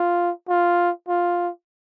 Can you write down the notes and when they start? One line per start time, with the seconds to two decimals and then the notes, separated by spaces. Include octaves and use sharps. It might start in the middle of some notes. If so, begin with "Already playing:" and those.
Already playing: F4
0.49 F4
1.08 F4